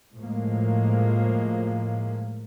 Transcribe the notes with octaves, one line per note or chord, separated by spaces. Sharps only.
A2 F3 G#3 A#3